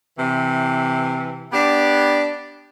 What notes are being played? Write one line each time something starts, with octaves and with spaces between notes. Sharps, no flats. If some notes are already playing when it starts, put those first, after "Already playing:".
C3 E3
B3 D4 G4